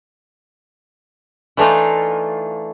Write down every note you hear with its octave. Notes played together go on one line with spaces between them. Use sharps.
E3 A3 D4 D#4 F4